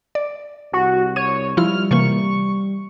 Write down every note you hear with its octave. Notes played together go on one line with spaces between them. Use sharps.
D5
C2 F#4
C#5 D#7
F3 G3 E4 F4 F6
C3 E3 A#3 C#6